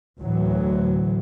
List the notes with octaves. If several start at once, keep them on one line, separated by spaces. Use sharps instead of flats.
D2 A2 E3 F#3